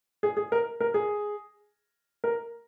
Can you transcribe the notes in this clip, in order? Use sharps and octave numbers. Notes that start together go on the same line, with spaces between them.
G#4
G#4
A#4
A#4
G#4
A#4